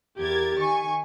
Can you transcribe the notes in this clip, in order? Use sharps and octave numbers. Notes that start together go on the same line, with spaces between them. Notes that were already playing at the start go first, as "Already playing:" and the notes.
E2 G4 A#4 G#6 A6
D#3 G#5 C#6